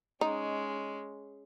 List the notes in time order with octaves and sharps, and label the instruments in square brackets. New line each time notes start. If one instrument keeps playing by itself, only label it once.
[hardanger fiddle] G#3 C#4 [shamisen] D#4